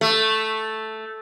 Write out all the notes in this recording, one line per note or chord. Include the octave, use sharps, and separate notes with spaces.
A3